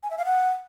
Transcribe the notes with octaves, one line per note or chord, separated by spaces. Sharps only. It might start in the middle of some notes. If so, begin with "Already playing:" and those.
G#5
E5
F5
F#5